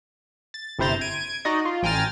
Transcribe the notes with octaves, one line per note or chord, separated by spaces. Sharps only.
A6
G1 C3 E4 C5 A#5 A6
G#6 D7 D#7
D#4 F#4 D5 D#5
F4
A1 G5 G#5 A#5 F6 A6